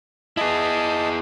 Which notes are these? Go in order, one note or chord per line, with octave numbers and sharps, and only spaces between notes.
E4 G#4 D#5 A5